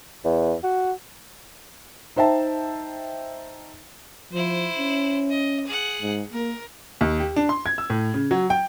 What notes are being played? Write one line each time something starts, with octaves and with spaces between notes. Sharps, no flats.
E2
F#4
D#4 C5 E5 G5 A5
F3 E4 C5
C#4
D#5
G#4 F#5
G#2
A#3 A#4
D#2
G4
D4
C6
G#6
E6
A2
C#3
F#3
G5